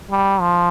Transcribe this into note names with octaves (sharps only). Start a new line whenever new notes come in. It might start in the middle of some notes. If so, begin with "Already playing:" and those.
G3
F3